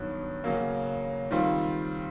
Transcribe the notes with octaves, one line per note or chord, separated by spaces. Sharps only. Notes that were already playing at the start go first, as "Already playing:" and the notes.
Already playing: G2 D#3 F#3 B3
C#3 F#3 A#3
D#3 G3 C4 F4